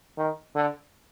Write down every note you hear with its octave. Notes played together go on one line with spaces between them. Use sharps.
D#3
D3